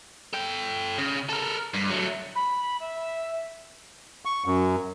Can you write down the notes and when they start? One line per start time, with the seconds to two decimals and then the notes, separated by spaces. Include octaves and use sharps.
0.33 A4 G5
0.98 C#3
1.29 A4 A#4
1.74 G2
1.90 F#3 A3
2.35 B5
2.80 E5
4.25 C#6
4.46 F#2